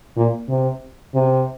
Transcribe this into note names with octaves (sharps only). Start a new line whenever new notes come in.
A#2
C3
C3